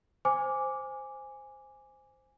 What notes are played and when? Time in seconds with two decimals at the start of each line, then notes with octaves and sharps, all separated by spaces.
0.25 C5 G#5 D6